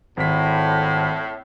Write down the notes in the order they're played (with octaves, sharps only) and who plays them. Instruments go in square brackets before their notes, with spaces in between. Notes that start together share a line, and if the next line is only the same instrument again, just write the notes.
[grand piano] G#1 B6 [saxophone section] A2